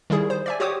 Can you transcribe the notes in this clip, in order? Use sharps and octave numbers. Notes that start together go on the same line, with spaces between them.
D#3 G3 E4 G#4
C5
D5 E5 G#5
F#4 G4 C5 C#5 D6 D#6